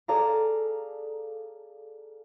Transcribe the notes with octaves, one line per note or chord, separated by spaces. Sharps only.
G#4 A4 D5 F5 A#5